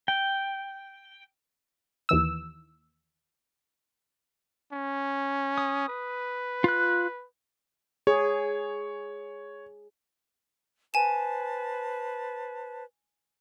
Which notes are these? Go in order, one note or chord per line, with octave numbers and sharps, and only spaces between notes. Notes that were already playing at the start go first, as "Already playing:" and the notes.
G5
D#2 E3 E6
C#4
D#6
B4
F4 F#6
G#4 C#5
B4 C5 G#5 A5 E7